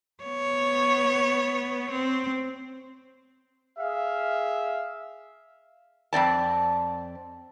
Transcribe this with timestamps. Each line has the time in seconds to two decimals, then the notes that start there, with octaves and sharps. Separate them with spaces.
0.24 B3 C#5
1.91 C4
3.77 G#4 E5 F5
6.13 F2 C4 D5 A5